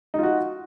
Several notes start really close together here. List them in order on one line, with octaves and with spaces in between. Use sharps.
D#4 F4 F#4